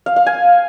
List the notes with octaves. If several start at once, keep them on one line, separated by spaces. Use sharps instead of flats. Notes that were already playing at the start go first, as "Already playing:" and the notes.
F5
F5
G#5